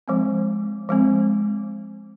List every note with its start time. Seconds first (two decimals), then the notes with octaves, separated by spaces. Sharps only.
0.08 F3 G#3 C4
0.89 F3 G#3 C4